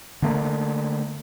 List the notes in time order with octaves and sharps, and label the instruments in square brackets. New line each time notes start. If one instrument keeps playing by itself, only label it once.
[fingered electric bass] D3 A3 A#3